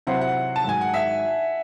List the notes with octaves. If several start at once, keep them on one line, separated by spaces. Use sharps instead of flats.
C3 F#3 C4 E4 C5 F#5
F#5
A5
G#2 D#3 F#3 G#5
F#5
E5